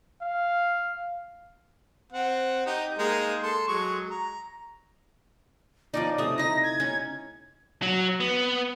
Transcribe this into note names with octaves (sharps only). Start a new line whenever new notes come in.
F5
C4 F#5
D#4 G4
G#3 A#3 D#4
A4 C6
F#3 G#3 C#6
A#5
F3 C#4 D#4 D5
C3 A3 D#6
D#4 E4 A#6
G#6
C#4 D#4
F#3
B3